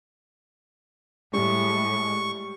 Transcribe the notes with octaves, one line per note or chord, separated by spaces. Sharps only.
A2 G3 G#3 C#6